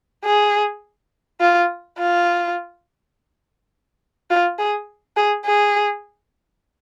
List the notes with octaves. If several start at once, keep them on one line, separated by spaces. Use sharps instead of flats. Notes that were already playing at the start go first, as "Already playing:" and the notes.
G#4
F4
F4
F4
G#4
G#4
G#4